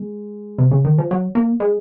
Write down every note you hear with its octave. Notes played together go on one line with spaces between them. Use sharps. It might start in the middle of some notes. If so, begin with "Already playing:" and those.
Already playing: G#3
C3
C#3
D#3
F3
F#3
A#3
G#3